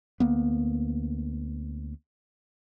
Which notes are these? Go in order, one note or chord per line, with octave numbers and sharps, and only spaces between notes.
D2 A#3 B3